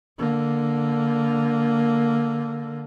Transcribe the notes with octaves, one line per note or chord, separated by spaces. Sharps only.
D3 A#3